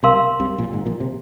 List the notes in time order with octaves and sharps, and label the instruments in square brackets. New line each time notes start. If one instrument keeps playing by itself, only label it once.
[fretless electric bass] C2 C3 [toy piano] A#4 F5 C6
[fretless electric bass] C2 C3
A#1 A#2
G#1 G#2
A#1 A#2
C3